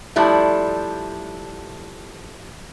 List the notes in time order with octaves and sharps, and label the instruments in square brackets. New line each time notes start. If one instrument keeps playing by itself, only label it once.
[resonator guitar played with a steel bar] F3 G3 A3 D4 E4